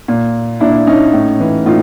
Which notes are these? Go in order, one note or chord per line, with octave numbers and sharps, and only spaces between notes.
A#2
A#2 D4 E4
C#4 D#4
A2
E3
A2 D#4 F4